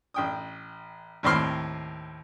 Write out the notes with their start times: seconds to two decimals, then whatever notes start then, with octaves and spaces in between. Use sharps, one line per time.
0.14 A1 G5 D#6
1.23 D#2 A2 C4 B5 C6 F6